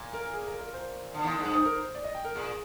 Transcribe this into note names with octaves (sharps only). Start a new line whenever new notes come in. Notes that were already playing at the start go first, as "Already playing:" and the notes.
Already playing: A#2
A#4
G#4
A#4
A#4
C5
D3
D#2 D#3
G#2 D3
G2
C5
A#4
C5
D5
D#5
G5
A#4
A#2 G#4